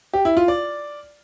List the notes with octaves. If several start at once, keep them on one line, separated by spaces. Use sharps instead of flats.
G4
E4
F4
D5